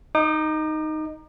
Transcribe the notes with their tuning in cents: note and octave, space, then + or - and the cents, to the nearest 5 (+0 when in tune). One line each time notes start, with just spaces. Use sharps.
D#4 +0 D6 +45